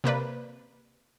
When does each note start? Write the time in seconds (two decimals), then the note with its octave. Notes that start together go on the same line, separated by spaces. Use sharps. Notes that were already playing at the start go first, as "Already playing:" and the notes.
0.04 C3 A#3 B4 D5